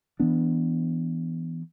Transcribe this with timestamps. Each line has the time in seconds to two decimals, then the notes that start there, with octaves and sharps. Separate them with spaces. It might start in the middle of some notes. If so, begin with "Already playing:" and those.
0.20 E3 B3 D4